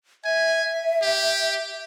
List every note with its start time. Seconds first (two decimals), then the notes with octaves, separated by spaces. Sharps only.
0.25 E5 G#5
1.02 G4